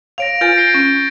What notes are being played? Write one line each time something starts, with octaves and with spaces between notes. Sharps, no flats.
C#5 F5 A#6 D7 F7
F4 B4 G#5 G6 A6 D7
A#6 C7 G7
C#4